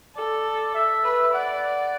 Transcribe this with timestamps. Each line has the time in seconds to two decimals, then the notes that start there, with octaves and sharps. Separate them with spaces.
0.15 A4 D5
0.74 E5
1.04 B4
1.33 D5 F#5